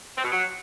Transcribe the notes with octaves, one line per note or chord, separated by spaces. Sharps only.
C4
B2
F#3